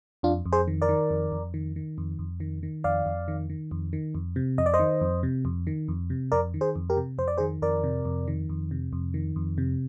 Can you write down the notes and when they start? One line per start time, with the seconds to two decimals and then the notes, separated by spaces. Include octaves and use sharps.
0.23 F2 D4 F4
0.46 F2
0.52 G#4 C5
0.68 D#3
0.82 A#4 D5
0.89 D#3
1.11 F2
1.32 F2
1.54 D#3
1.76 D#3
1.98 F2
2.19 F2
2.40 D#3
2.63 D#3
2.84 F2 D5 F5
3.06 F2
3.28 D#3
3.50 D#3
3.71 F2
3.93 D#3
4.15 F2
4.36 C3
4.58 F2 D#5
4.66 D5
4.74 C5 D#5
4.79 D#3
5.01 F2
5.23 C3
5.45 F2
5.67 D#3
5.88 F2
6.10 C3
6.32 F2 A#4 D5
6.54 D#3
6.61 G#4 C5
6.76 F2
6.90 G4 A#4
6.97 C3
7.18 F2 C5
7.28 D5
7.38 D#3 G#4 C5
7.62 F2 A#4 D5
7.84 C3
8.05 F2
8.28 D#3
8.49 F2
8.71 C3
8.93 F2
9.14 D#3
9.36 F2
9.58 C3